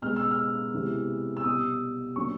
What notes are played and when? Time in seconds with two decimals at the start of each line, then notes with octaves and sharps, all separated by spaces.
0.02 B2 G#3 B3 F6
0.16 E6
0.31 F6
0.73 C3 E3 G#3 B3
1.37 E6
1.44 B2 G3 B3 D#6
2.16 D3 F#3 A#3 C#6